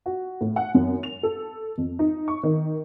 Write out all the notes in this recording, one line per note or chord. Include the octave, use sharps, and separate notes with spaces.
F#4
A2
F#5
F#2
F7
A4
F2
D#4
C#6
D#3